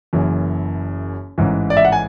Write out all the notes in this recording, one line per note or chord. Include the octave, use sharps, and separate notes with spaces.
F#1 F#2 E3
A1 G#2 E3
D5
E5
F#5
G#5